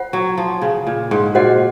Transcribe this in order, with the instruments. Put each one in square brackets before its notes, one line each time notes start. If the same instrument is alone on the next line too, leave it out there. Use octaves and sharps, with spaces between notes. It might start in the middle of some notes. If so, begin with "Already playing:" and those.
Already playing: [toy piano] F4 C5 F#5
[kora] F#3
F3
C#3
A#2
G#2
[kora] A#2 [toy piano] F#4 C5 D#5 F#5